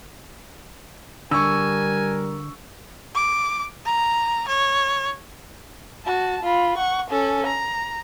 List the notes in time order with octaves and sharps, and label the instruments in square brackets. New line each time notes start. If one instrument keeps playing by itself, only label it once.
[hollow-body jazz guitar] D3 [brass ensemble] G3 A#4 [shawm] G#5 [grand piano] C#6 E6
[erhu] D6
A#5
C#5
[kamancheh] F#4 A5
F4 B5
F#5 C#6
C#4 A4
A#5